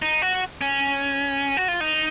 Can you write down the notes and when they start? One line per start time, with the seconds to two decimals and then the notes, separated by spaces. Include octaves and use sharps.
0.02 D#4
0.22 F#4
0.61 C#4
1.57 F#4
1.68 F4
1.80 D#4